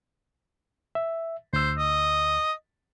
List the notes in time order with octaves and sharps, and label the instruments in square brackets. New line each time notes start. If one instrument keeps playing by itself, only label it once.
[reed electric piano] E5
[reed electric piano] D2 E6 [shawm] C5
[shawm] D#5